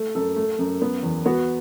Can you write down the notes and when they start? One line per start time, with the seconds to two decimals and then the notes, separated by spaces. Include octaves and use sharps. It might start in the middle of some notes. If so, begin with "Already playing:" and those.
Already playing: A3
0.15 F#2 A4
0.36 A3
0.59 F#2
0.82 B3
1.03 E2
1.26 B3 F#4